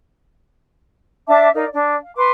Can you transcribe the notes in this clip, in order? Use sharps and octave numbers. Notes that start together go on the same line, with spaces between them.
D4 E5 A5 D6
D#4 A#4 D5 F5
D4 D5
F5
B4 C6 D6